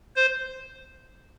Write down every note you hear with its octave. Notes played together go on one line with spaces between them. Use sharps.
C5